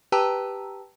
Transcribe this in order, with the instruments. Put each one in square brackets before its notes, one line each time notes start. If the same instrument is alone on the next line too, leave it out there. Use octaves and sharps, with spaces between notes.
[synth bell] G4 B4 G5 A5 A#5 E6